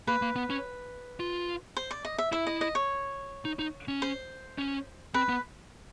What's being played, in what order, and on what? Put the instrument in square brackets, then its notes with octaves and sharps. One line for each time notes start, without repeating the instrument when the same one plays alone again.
[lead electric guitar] A#3 [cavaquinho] B4
[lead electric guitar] A#3
B3
C#4
F4
[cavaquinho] C5
D5
D#5
E5
[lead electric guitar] E4 [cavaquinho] E5
[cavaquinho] D#5
D#5
C#5
[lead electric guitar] D#4
D#4
C#4
[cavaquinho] C5
[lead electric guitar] C#4
[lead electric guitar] C4 [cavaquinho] B4
[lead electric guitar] B3